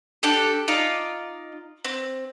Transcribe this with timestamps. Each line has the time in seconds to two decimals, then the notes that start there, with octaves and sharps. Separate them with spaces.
0.23 D4 G4 A4
0.68 D#4 F4 D5 F5
1.85 C4